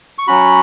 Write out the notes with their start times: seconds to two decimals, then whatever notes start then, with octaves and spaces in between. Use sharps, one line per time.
0.18 C#6
0.27 F#3 C#4 F#4 B5